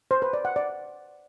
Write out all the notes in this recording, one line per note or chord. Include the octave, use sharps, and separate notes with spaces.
C5
B4
D5
F#5
D5